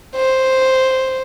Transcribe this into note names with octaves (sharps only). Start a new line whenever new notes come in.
C5